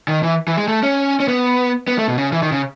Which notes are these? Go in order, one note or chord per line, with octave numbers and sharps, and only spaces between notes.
D#3
E3
E3
G#3
A3
C#4
C#4
B3
B3
A3
B2
C#3
E3
D#3
C#3